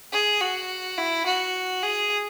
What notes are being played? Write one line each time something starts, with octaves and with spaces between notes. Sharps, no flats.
G#4
F#4
E4
F#4
G#4